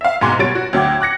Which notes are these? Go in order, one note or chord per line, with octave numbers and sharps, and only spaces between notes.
E5 F5
F#1 G#2 B2 G#5 C6 D6
B2 F#3 G3 C#5 A6 D7
F#4
D2 F#3 G5 D6 G#6
D6 F#6 A#6 C#7